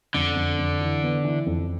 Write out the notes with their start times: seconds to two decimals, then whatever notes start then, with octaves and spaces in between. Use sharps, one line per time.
0.14 F2 D3
0.36 F2
0.59 F2
0.81 E3
1.03 B3
1.24 E3
1.46 F2